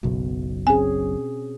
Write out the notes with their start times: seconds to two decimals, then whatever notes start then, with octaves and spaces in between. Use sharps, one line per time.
0.03 F#1 B1 B2
0.67 C4 C#4 G#4 G#5